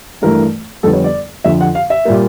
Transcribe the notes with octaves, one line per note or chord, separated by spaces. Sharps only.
G2 E3 A3 A#4
F2 D3 G3 B3 A4
C#5
D5
F2 D3 F3 E5
F#5
F5
E5
A#2 G3 A#3